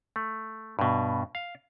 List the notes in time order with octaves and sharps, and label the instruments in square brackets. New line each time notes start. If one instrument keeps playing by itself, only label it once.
[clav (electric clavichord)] A3
G2 B2
F5